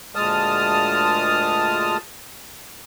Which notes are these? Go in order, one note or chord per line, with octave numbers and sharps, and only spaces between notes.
D2 A#2 G#3 A5 D#6 F6